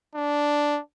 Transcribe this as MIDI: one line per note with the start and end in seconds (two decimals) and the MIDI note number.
0.15 0.80 62